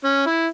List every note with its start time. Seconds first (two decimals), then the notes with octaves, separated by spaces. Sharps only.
0.04 C#4
0.26 E4